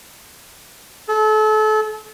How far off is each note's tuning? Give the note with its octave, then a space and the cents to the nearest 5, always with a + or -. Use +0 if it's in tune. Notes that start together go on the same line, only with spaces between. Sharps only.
A4 -35